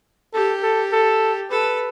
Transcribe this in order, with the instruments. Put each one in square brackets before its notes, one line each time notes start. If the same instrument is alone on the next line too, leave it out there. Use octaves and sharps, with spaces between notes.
[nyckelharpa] G4 [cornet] A4
[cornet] A4
A4
[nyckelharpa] A4 [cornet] B4